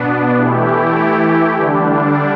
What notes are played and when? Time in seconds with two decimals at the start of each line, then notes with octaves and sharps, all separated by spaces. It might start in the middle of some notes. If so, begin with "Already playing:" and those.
Already playing: B2 B3 D4
0.36 E3 A3 E4 G4
1.57 D3 G3 D4